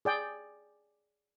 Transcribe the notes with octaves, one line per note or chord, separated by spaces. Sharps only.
G#4 D5 G5